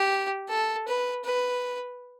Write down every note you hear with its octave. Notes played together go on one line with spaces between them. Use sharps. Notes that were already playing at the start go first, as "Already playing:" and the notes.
Already playing: G4
A4
B4
B4